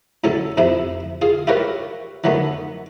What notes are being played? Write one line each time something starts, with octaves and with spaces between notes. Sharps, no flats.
A2 F#3 C#4 A4
F2 C3 E4 E5
F4 G#4
E4 F4 G4 A#4 B4 C#5
D3 D#3 F#3 A3 B3